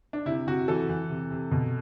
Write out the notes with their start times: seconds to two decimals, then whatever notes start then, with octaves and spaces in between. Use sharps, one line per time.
0.13 D4
0.26 C3 E4
0.47 C3 F#4
0.68 E3 A4
0.89 E3
1.10 C3
1.30 C3
1.51 B2